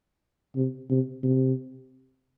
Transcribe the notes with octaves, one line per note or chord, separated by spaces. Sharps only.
C3
C3
C3